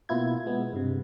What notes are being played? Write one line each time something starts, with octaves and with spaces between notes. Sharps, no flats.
B2 A#3 B3 E4 F4 G#6
G#3 B3
G2 C3